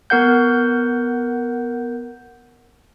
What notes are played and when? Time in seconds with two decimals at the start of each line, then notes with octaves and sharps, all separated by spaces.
0.10 B3 A#4 F#5 G6